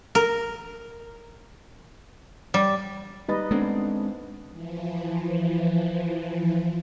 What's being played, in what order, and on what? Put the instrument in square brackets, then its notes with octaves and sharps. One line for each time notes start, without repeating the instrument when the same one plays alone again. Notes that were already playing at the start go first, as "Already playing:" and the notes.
[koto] A#4
G3
[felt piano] G3 B5 A6 [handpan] D#4 B4 D#5
[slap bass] G#3 C4 [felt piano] A3 B3 D4
[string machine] E3 F3